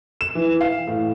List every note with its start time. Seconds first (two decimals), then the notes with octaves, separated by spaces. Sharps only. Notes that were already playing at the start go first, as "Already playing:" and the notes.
0.21 E7
0.35 E3
0.61 F5
0.87 A2